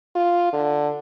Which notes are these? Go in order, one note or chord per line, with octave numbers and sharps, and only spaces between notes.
F4
D3